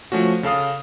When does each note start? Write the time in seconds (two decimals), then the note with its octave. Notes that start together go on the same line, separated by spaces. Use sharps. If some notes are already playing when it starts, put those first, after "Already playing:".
0.12 F3 A3 C#4 F#4
0.43 C#3 A4 F5 D#6